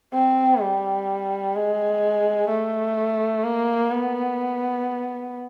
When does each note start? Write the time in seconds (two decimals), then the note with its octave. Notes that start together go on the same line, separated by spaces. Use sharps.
0.13 C4
0.61 G3
1.55 G#3
2.49 A3
3.44 A#3
3.92 B3